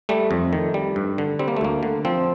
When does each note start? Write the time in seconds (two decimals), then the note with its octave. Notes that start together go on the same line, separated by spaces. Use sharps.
0.09 G3 A3
0.31 F2
0.53 D#3
0.74 G3
0.96 G2
1.18 D3
1.39 G3 C4
1.48 A#3
1.57 A3
1.61 D2 A#3
1.83 D3
2.05 F3 C4